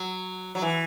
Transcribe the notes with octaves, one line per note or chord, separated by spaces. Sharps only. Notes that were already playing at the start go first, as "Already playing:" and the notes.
Already playing: F#3
F#3
E3